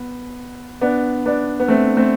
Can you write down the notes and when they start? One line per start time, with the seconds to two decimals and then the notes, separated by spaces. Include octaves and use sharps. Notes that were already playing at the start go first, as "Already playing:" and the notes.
Already playing: B3
0.81 B3 D4
1.26 B3 D4
1.60 B3
1.68 A3 C4
1.97 A3 C4